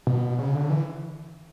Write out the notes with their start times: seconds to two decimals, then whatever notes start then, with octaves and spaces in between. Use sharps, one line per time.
0.07 B2
0.39 C#3
0.55 D3
0.70 E3